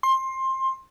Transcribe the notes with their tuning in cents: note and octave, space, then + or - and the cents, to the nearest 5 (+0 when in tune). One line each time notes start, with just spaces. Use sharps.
C6 +20